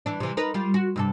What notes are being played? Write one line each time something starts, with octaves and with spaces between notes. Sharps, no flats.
E3 D4
C3 E3
D#4 A#4 B4
G3 F4 G4
F#4
G2 C3 A4